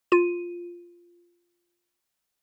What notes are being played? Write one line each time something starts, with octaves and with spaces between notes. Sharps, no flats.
F4 D#7